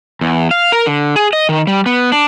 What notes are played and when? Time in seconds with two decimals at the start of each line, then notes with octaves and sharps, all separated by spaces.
0.21 E2
0.51 F5
0.72 A#4
0.86 D3
1.16 G#4
1.33 D#5
1.49 D#3
1.67 G3
1.86 B3
2.12 D4